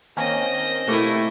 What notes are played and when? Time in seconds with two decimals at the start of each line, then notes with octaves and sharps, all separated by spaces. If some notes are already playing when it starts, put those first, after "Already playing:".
0.17 D#3 A#3 C4 C#4 D#5
0.87 B2 A3 A#3 E4 G4